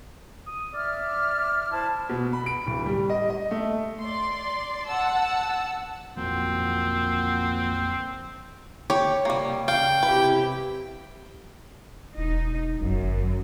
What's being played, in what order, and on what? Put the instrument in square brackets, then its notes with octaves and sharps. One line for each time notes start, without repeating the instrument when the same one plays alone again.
[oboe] D#6
[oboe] D5 [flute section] E5 F6
[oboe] E4 [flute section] C5 A5
[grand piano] B2
B5
D7
D1
G3
D#5
D#5
A3
[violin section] D5 C6
F#5 A5 E6
[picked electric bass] A#1 F2 F#3 [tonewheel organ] F3 A#3 F#5 [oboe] C4
[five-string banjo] G4 [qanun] C#5
[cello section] C3 [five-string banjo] G3 A#3
[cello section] C#3 [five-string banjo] F5 [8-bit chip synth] G5
[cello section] C3 E4 G4 [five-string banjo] B4
[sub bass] E1 [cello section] D#4
[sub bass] G1 [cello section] F#2